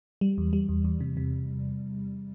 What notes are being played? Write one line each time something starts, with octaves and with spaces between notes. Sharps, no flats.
G3
E2
G3
E2
E2
C3
C3